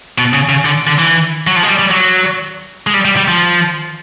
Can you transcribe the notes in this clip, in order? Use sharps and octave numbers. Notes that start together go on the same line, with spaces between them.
B2
C#3
C#3
D3
D3
E3
F#3
F3
G#3
G3
G3
F#3
G#3
G3
G3
G3
F3